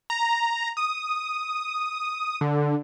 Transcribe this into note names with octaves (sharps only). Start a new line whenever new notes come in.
A#5
D#6
D3